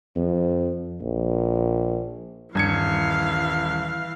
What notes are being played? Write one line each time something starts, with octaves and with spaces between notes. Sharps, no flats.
F2
A#1
D#1 G2 E3 F5 G#6 C#7